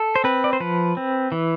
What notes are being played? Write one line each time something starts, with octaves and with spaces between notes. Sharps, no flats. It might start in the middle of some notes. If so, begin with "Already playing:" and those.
Already playing: A4
C5
C4 B4
D5
C5
F3 B4
C4
E3